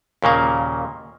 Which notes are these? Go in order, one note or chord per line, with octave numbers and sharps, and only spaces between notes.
D#2 A#2 C#3 A#3